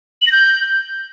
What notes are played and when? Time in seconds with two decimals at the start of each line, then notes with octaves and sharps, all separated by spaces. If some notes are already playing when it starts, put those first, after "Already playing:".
0.22 F#7
0.27 A#6
0.32 G6